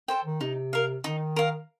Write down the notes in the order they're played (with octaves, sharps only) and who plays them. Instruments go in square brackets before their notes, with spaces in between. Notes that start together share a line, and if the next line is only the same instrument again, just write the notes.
[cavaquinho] A4 C5 G5
[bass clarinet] D#3
[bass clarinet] C3 [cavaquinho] D#4
[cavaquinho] A#4 F5
[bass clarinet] D#3 [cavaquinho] D#4
[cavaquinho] A#4 F5